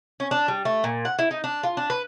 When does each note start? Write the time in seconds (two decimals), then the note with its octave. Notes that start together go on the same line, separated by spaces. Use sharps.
0.20 C#4
0.31 D4
0.48 G3
0.65 A3
0.84 A#2
1.05 F#5
1.19 E4
1.31 D#4
1.44 D4
1.63 F4
1.77 D4
1.90 B4